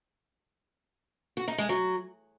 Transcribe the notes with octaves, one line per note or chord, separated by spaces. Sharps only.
F#4
D#4
G#3
F#3